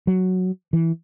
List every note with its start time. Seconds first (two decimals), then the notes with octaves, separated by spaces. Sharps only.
0.07 F#3
0.73 E3